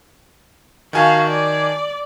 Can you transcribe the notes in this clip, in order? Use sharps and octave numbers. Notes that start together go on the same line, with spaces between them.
D#3 F#4 F5 G#5 A5
D5